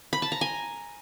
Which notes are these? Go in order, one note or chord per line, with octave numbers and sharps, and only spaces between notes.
B5
A5
A#5
G#5